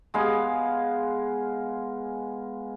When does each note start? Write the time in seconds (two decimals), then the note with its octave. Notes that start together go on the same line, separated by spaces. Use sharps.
0.14 G#3 B3 F5 G#5